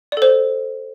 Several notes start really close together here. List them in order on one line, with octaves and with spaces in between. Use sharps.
D5 A4 C5